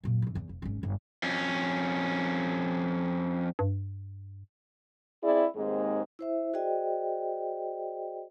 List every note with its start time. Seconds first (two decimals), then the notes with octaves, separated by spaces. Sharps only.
0.04 F#2 A#2
0.22 G1 E3
0.35 E2
0.49 F1
0.62 G#1 C#4
0.83 G1
1.23 F2 C#4
3.59 G2
5.23 C4 E4 G#4 D5
5.56 D#2 G#2 G#3 C4
6.19 E4 C5 E5
6.53 F#4 G#4 C5 D5 D#5 G5